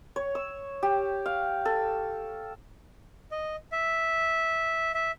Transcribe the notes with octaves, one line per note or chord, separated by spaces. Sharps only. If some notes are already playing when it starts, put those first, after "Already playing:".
C#5
E6
G4
F5
A4
D#5
E5
E5